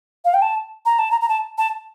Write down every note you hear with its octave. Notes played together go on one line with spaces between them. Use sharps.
F5
G5
A5
A#5
A5
A#5
A#5
A5
A5